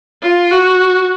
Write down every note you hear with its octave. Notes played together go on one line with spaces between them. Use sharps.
F4
F#4